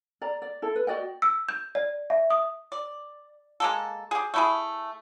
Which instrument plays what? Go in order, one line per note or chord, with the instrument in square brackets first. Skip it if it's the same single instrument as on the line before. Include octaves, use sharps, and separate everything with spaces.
[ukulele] D5 A#5
D5
E4 A4
B4
F#4 D5 D#5 G5
[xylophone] E6
G6
D5
E5
D#6
[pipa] D5
G#3 A#3 A4
G4 G#4
A3 E4 G#4